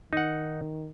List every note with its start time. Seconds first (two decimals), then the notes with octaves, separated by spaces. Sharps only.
0.13 D#3 D#4 F#5